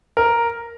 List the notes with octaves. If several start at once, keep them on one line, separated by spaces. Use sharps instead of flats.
A#4